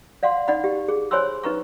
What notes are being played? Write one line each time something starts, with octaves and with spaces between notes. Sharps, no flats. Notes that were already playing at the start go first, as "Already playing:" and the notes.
D5 F5 F#5 C6
D#4 D5 F#5 B5
G4
G#4
C5 C#5 G#5 B5 C6 E6
D#4 B4 A#5 C#6